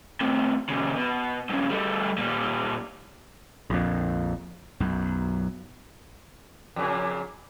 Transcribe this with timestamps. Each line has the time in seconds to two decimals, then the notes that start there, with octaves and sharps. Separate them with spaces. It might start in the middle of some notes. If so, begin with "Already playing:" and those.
0.21 A2 C3
0.70 A#2 C#3
0.96 B2
1.50 G2 C#3
1.71 G3 A3
2.18 A#2 G3
3.70 A#1 F2
4.80 B1 F#2
6.76 F2 A#2 C#3